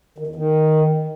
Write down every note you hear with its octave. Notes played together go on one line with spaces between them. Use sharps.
D#3
E2
D#3